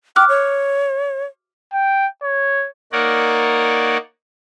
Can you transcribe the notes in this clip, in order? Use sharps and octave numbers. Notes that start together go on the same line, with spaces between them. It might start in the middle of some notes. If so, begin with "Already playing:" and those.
G5 D6 F6 F#6
C#5
G5
C#5
A#3 D#4 A#4 C#5 D5 F#5